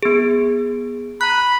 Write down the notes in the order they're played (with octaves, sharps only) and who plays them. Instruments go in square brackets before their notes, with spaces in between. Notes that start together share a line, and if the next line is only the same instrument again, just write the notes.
[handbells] B3 G#4
[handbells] A#5 F#6 [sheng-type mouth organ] B5